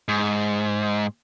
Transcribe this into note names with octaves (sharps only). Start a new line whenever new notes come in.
G#2